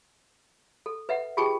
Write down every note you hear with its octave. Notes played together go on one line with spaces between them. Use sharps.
A4
B4 E5 F#5
F4 G4 G#4 G5 A5 C#6